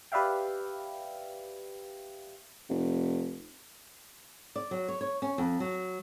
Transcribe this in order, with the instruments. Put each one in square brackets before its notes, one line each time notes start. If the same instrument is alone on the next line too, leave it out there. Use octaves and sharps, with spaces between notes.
[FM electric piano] G4 B4 D5 E5 F5 G5
[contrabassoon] F1
[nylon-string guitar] D5
F#3
C#5
C#5
C#4
F2
F#3